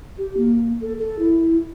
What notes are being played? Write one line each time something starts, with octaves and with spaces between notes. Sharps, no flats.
G4
A#3
A4
A4
E4